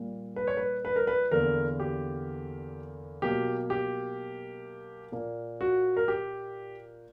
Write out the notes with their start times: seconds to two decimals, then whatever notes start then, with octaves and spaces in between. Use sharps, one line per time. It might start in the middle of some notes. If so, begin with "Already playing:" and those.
Already playing: A#2 G3 A#3
0.36 B4
0.47 C#5
0.57 B4
0.85 B4
0.96 A#4
1.07 B4
1.32 E2 D3 A#3 A#4
1.80 G4
3.22 B2 F#3 A#3 G4
3.70 G4
5.12 A#2 A#3
5.61 F#4
5.97 A#4
6.08 G4